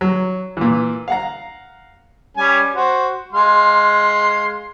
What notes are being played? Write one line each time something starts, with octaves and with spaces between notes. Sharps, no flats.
F#3
A#2 E3
F5 F#5 A#5
G3 C#4 G#5
F#4 C5
G#3 F5 C6